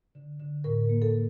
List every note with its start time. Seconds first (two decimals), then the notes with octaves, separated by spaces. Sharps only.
0.15 D3
0.40 D3
0.64 A2 A#4
0.89 A#3
1.02 A4